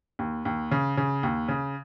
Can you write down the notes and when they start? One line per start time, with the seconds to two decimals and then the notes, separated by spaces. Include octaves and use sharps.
0.19 D#2
0.45 D#2
0.71 C#3
0.97 C#3
1.23 D#2
1.48 C#3